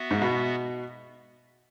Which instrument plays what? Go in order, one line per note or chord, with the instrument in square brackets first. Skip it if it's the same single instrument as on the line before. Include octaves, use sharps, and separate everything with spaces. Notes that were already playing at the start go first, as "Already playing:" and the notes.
Already playing: [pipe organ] B3 F#4 E5
[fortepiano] G#2
B2